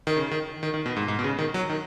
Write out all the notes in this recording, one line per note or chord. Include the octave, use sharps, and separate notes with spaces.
D#3
C#3
D#3
D#3
D#3
B2
G#2
G#2
B2
C#3
D#3
F#3
D#3